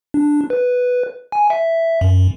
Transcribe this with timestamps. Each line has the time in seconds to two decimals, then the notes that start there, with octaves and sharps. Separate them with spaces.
0.14 D4
0.50 B4
1.32 G#5
1.50 E5
2.01 F#2